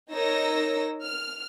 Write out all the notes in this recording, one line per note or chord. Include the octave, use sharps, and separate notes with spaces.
D#4 A#4 C#5 E6 A#6
F6